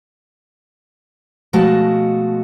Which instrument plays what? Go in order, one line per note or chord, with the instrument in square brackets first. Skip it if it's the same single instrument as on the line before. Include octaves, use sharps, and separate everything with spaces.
[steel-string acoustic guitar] B2 F3 G#3 A3 F#4 A5